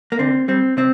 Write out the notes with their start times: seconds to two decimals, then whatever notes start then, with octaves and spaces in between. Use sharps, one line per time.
0.12 A#3
0.19 D3 C4
0.48 G3 C4
0.77 C3 C4